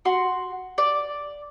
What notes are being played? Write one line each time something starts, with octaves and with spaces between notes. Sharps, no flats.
F#4 C6
D5